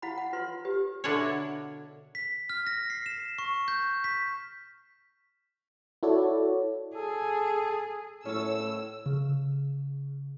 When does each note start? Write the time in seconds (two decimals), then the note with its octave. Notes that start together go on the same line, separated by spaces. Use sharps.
0.02 E4 F5 F#5 B5
0.18 F#5
0.33 F4 B4 C6
0.65 G4 B4
1.04 B2 D3 D4 E4 A#4 C#5
2.15 B6
2.50 F6
2.67 A#6
2.90 C7
3.06 E7
3.38 C#6
3.68 G6
4.04 B6
6.03 E4 F#4 A4 C#5 D5
6.96 G#4 A4
8.25 A2 C#4 A4 E6
9.06 C#3